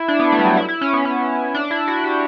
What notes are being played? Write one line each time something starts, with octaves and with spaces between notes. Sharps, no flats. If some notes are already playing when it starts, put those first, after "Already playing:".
Already playing: E4
D4
B3
A3
G3
F#3
E4
E4
C#4
B3
C#4
D4
E4
F#4
G4